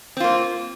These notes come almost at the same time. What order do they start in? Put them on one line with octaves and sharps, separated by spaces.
C4 F4 A#3